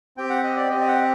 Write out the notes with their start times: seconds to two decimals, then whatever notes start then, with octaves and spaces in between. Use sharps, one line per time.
0.17 C4 G4 G5
0.30 F#5
0.44 D#5
0.57 D5
0.70 C4 D#5
0.74 G4
0.81 D#5
0.88 F#5